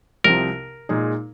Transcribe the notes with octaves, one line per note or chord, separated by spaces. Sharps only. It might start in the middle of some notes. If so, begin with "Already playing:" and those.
C2 C3 F3 C4 A#4
A#2 G#3 D#4 G#4